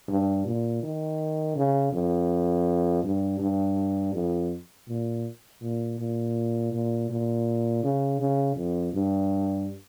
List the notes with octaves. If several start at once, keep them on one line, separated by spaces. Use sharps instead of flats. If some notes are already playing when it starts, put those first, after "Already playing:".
G2
A#2
D#3
C#3
F2
G2
G2
F2
A#2
A#2
A#2
A#2
A#2
C#3
C#3
F2
G2